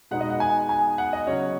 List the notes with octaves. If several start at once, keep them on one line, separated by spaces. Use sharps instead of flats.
B2 G#3 B3 D#4 F#5
D#5
F#5
G#5
G#5
F#5
D#5
C#3 F#3 C#4 C#5